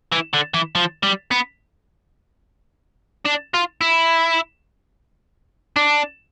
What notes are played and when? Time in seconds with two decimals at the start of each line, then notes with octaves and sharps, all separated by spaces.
0.12 E3
0.34 D3
0.54 E3
0.75 F3
1.03 G3
1.31 B3
3.26 D4
3.54 F4
3.81 E4
5.76 D4